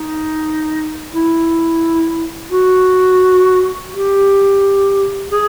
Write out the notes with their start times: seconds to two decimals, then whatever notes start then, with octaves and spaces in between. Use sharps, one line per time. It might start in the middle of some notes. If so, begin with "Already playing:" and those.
Already playing: D#4
1.13 E4
2.52 F#4
3.92 G4
5.31 G#4